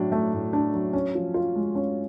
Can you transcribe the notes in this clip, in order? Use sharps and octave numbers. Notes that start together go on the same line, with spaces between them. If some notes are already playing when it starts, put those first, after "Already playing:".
Already playing: A2 F#3 D4
A3
A2
D4
F#3
C#4
F3
F4
G#3
C#4